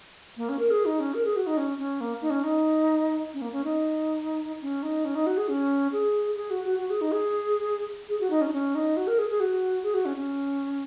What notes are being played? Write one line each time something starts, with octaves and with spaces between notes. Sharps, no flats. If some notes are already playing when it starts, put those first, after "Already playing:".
A#3
C#4
A#4
G#4
D#4
C#4
A#4
G#4
F#4
D#4
C#4
C#4
A#3
D#4
C#4
D#4
C#4
A#3
C#4
D#4
C#4
D#4
C#4
D#4
F#4
G#4
C#4
G#4
G#4
F#4
F#4
F#4
G#4
D#4
G#4
G#4
F#4
D#4
C#4
D#4
C#4
D#4
F#4
A#4
G#4
G#4
F#4
G#4
F#4
C#4
C#4